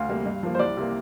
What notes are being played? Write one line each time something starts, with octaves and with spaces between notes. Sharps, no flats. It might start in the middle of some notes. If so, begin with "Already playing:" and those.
Already playing: D2 F5
C3 G3 A#3
G2
F3 A#3
C5
C2 D5
C3 A#3